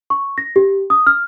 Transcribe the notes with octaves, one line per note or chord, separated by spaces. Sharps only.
C#6
A#6
G4
D#6
F6